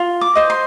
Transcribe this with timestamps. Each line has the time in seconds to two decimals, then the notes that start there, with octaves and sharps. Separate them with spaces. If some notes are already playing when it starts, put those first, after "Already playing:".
Already playing: F4
0.21 D6
0.35 C5 D#5
0.50 C6